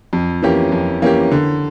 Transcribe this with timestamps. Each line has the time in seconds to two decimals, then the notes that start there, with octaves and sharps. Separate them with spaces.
0.13 F2
0.42 E3 A#3 C#4 G4
0.72 F2
1.02 E3 A#3 C#4 G4
1.32 D3